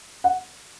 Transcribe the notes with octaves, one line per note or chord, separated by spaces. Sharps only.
F#5